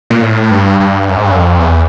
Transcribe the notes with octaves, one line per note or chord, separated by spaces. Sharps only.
A#2
A2
G2
G2
F#2
G#2
G2
F#2
F2
E2